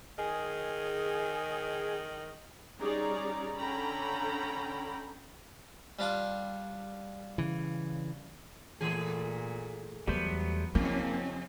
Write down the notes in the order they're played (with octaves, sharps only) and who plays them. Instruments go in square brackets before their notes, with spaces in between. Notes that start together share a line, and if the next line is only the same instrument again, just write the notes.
[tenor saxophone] D#3 [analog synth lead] G#4
[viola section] G3 C#4 D#4 G#4 D5 A#5
D3 C#4 A4 G5 A#5 B5
[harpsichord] G3 D4 F4
[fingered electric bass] C#3 E3
[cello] A#2 [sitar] E3 A3 G#4
[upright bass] E2 [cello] F#3 [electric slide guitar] G3 A3 C5 [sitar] B3
[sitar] F2 C#3 [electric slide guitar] A#3 [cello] C4 C#4 [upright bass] E4